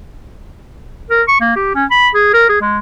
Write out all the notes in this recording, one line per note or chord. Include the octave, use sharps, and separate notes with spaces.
A#4
C#6
A#3
G4
C#4
B5
G#4
A#4
G#4
G#3